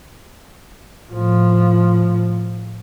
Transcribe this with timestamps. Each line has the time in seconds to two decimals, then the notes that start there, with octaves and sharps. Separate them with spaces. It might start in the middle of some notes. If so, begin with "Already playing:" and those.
1.10 A2 F3